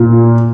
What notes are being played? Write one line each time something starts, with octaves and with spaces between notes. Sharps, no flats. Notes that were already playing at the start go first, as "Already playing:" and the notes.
Already playing: A#2